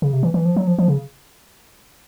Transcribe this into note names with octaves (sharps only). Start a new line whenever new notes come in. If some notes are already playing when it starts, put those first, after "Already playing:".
C#3
C3
E3
E3
F3
F#3
F3
F3
C#3